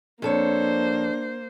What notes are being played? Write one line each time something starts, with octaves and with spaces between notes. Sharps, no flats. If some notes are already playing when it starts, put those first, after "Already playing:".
F2 A#3 D4 A4 C5 C#5